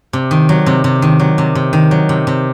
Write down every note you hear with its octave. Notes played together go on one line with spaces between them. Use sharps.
C3
D#3
F#3
C3
C3
D#3
F#3
C3
C3
D#3
F#3
C3
C3